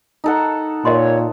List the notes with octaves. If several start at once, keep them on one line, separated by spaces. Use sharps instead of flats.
D#4 A4 F#5
A#2 A#4 C#5 D#5 C6